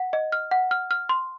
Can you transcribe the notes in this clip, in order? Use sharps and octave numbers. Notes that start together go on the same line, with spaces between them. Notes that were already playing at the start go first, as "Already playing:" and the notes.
Already playing: F#5
D#5
F6
F#5
F6
F6
C6